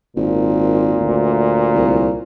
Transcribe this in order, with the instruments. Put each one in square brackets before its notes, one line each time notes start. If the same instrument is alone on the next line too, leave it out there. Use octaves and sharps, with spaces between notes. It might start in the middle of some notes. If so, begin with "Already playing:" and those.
[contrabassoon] G#1 [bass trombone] A#2
[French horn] D2
[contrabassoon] C2